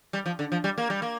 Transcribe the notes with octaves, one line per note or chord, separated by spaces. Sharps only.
G3
F3
D3
F3
G3
A#3
G3
A#3